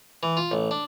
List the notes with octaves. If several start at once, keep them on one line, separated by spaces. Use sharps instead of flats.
E3
F4
A1
D4